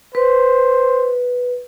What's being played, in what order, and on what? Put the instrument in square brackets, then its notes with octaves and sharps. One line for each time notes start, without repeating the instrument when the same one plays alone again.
[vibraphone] B4 [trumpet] C5